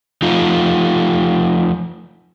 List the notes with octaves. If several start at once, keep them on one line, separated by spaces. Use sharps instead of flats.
F3 A3 D#4 F4